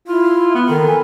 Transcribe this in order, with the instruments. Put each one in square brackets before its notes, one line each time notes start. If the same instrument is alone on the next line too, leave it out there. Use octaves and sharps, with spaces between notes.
[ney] E4 [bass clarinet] F4
[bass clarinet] B3
[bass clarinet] D#3 [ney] A4
[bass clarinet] E3